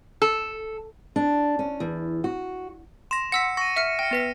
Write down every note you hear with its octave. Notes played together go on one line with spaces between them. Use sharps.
A4
D4
C#4
E2
F#4
C6 A#6 E7
F#5 E6 A#6 B6 C#7
C#6 A#6 D#7
E5 F6 C#7
G5 F6 C#7
B3 B4 B6